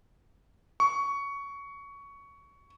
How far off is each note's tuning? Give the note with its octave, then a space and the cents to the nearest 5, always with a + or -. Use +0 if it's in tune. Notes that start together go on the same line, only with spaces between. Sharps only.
C#6 +15